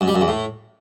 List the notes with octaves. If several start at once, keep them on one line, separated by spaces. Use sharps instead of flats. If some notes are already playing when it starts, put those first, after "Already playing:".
F#2
G3
F#2
E2
A2